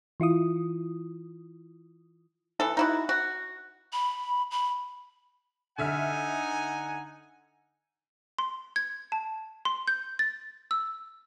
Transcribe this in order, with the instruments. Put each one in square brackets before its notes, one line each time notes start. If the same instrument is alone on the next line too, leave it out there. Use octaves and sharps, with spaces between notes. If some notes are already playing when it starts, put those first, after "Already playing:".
[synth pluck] E3 E4 F4 D#6
[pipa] E3 A4
D#4 E4 F#4
F#4
[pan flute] B5
B5
[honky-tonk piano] D3 E5 F6 [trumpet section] D#4 F#5 G#5
[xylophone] C6
G#6
A5
C6
G6
A6
E6